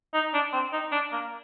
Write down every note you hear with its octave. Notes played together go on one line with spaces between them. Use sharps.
D#4
D4
C4
D#4
D4
A#3